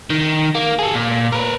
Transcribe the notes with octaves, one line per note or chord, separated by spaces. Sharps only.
D#3
A#3
G#4 A4
A#2
A#4 B4